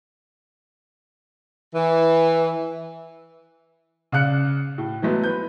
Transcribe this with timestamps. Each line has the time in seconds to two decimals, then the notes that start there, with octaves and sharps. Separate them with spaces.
1.75 E3
4.12 C#3 D5 F5 F#6 C#7
4.78 A2
5.02 E3 F#3 G#3 A3 B3
5.23 B4 G6